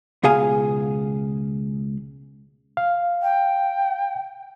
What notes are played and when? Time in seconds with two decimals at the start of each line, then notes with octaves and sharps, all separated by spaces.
0.23 C#2 B2 G#4 F5 G#5
2.77 F5
3.23 G5